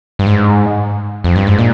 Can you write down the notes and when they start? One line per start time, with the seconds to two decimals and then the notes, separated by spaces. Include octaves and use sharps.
0.19 G2
0.26 G#2
1.24 F2
1.36 G2
1.47 G#2
1.59 A#2